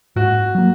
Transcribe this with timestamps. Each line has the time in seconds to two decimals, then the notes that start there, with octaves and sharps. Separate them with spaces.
0.16 G#2 F#4
0.55 F#3 A#3